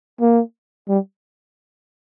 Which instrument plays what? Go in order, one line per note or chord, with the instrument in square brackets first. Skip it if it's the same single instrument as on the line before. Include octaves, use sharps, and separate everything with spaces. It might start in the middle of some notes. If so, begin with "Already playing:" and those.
[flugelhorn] A#3
G3